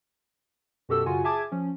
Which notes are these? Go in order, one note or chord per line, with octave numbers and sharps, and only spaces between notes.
F#2 B2 F#4 G4 A4 E6
F#2 C#3 F4 F#4 F#5 G#5
G#4 E5 G#5 A5 D6 G#6
F3 C#4